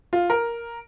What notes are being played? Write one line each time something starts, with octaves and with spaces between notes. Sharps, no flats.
F4
A#4